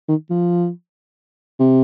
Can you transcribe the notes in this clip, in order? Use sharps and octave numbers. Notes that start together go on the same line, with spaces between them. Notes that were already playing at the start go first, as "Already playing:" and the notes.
D#3
F3
C3